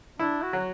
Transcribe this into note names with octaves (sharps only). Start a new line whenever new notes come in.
D4 E4
F#4
F#3